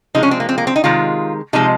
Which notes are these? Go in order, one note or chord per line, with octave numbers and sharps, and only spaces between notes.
C3 F3 G#3 D#4
C#4
C4
A#3
C4
A#3
C4
D#4
C3 D#3 G#3 F4
C3 F3 G#3 D#4